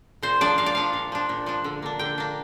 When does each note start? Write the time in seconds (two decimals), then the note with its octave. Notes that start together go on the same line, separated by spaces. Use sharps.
0.23 A#2 C5
0.41 F3 D4 D5
0.58 A#2 F5
0.66 D5
0.75 F3 D4 F5
0.93 A#2
1.12 F3 D4
1.29 A#2
1.46 F3 D4
1.64 D3
1.82 A#3 D4
1.99 D3 G5
2.18 A#3 D4